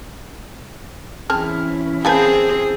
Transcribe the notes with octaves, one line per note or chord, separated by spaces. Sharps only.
E3 C4 C#4 E4 G#4 A5 F6
A#3 C4 G#4 B4 G#5 A5 G6